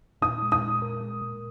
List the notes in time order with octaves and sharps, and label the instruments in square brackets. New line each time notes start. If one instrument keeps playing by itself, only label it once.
[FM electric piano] A#2 [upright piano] D#6
[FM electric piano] G#3
[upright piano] D#6
[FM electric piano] G#3
A#4
G#3
A#2